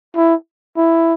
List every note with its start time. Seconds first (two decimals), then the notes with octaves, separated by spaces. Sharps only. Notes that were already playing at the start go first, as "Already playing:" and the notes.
0.16 E4
0.77 E4